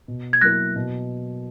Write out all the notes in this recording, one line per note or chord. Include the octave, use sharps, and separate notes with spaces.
B2
G#6
F#3 A#3 E4 A#4 F#6 A#6
B2